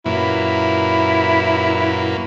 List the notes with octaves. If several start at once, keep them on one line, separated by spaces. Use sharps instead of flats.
F#2 A#2 E4 B4